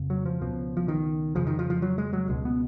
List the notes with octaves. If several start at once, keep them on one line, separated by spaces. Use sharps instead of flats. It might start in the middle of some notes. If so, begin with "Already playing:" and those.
Already playing: F2 C#3
F#3
F3
C#2 B2 F3
F3
D#3
F2 C#3 F3
D#3
F3
F3
F#3
G#3
F#3
C#2 B2 G#3
B3